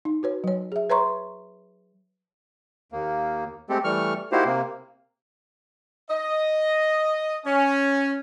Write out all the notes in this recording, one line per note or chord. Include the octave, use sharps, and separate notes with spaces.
D#4
F#4 B4 C#5
F#3 C#5
G#4 E5
B4 C#5 E5 A#5 C6 C#6
D#2 A#3
G#3 A3 C4 G4 A4
E3 G3 A3 C#6 F6
A#3 D#4 E4 F#4 G4 C5
C3 A#3
D#5
C#4